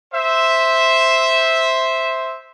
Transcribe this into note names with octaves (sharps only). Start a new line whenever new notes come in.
C5 E5